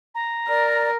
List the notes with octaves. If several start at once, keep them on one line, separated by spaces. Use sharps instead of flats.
A#5
A#4 D5